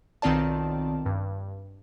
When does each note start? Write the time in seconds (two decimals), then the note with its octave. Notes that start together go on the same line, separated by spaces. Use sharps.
0.22 B1 D#3 C4 F4 D5 A5
1.06 G2